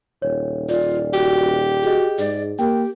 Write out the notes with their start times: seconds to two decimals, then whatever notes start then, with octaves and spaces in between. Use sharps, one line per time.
0.22 D#1 C#5
0.69 F4 D5
1.13 F#4 G4
1.83 F#4 G#4 D#5
2.19 G#2 D5
2.59 A#3 G4 G5